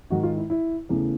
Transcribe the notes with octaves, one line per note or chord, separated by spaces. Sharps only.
G#2 D#3 G#3 F#4
F4
E4
E4
E2 C#3 E3 A3